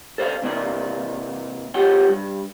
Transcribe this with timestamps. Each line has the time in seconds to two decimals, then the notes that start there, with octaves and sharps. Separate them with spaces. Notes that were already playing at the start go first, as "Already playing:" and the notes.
0.18 A4 C5 D5 E5 F5
0.42 C3 A#3 E4 D5
1.74 F4 G4 G#4 C#5 F#5 G5
2.09 G2